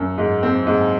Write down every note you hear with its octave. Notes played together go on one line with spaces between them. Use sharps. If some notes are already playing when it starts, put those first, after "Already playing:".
Already playing: F#2
G#2
C4
G#2